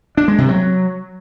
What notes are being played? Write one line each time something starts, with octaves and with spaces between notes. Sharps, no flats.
D4
G#3
C3
F#3